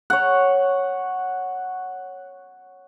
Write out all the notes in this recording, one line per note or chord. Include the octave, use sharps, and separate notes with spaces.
C#5 F#5